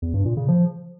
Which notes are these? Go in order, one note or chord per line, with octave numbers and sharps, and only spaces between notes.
E2
G2
A#2
C#3
F3